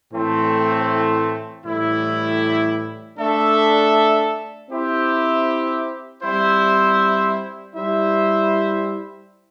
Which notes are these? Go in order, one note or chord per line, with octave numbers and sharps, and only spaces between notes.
A2 E3 A3 C4
A2 E3 G3 E4
A3 D4 A4 E5
C4 E4 G4 C5 E5
G3 C4 E4 C5 E5
G3 E4 C5 E5